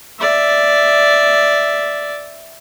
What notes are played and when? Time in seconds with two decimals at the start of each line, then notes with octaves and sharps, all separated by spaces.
0.19 D5 E5